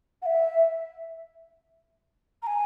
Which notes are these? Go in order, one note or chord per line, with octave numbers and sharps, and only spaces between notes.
F#5
E5
A#5
G#5